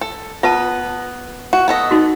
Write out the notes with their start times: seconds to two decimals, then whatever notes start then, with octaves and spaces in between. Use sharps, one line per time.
0.01 A4
0.43 B3 F4 B4 A5
1.53 F#4
1.68 B3 A4 D#5
1.91 D#4 F#4